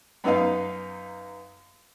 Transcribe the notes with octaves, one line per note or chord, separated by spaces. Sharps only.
F#2 B3 D#4 D#5 F5